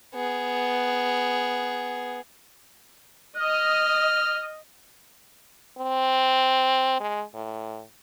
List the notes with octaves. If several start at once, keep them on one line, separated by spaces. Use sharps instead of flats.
B3 G#4
D#5 F6
C4
G#3
A2